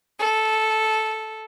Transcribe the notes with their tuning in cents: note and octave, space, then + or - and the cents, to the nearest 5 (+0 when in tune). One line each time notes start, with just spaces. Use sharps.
A4 -10